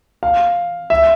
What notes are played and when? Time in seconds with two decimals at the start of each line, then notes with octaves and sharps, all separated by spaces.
0.23 F5
0.90 E5